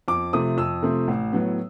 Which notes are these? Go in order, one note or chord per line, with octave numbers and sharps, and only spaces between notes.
F2 D6
C3 F3 A3 C4 D#6
F2 E6
C3 F3 A3 C4
A1
A2 F#3 B3